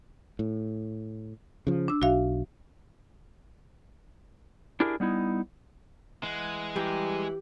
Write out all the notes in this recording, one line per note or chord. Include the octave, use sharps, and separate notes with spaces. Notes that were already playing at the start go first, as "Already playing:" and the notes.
A2
C#3 F3
D4 E6
B1 F#4 E5 F5
D4 E4 G4 G#4 A#4 E5
G3 B3 D#4 E4
E3 G#3 F#5
E3 G3 G4 G#4 A#5